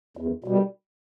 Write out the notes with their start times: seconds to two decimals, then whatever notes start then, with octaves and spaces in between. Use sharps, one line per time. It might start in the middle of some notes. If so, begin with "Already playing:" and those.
0.17 E2
0.44 B2 G3